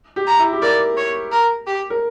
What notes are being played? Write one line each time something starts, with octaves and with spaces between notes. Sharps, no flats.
G4
A#5
E4
G4
A#4 D5
C#5
A#4
G4
A#4